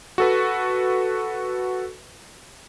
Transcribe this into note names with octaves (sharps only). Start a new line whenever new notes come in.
F#4 A4 B4